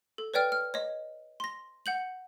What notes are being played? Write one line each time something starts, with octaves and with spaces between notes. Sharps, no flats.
A4
B4 C#5 D5 G5 F6
F6
C#5 D#5
C6 A#6
F#5 G6 F#7